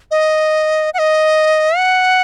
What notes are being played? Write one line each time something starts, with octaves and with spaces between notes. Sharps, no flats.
D#5
F#5
D#5
F#5